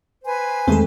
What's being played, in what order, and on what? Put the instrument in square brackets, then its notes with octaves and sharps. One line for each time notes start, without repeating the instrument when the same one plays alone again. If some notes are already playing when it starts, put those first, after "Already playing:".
[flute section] B4 C5 G#5
[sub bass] E2 [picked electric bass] D#3 A3 C4 [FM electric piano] G#3 A4